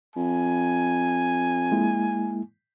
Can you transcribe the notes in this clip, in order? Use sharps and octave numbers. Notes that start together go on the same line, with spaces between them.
F2 G#5
G#3 A#3 E4